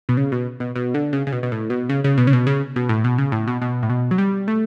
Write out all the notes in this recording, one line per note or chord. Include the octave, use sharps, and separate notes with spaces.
B2
C#3
B2
B2
B2
D3
C#3
C#3
B2
B2
A2
B2
C#3
C#3
B2
C#3
B2
C#3
B2
A2
B2
C#3
A2
B2
B2
A2
B2
F#3
G3
A3